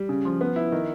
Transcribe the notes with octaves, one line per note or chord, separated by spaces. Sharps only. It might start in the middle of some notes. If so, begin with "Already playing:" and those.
Already playing: G3
C#3
F3
B3
E4
D#3